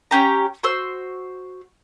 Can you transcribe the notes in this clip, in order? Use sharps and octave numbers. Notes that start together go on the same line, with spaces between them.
C#4 G4 A#5
F#4 C5 E6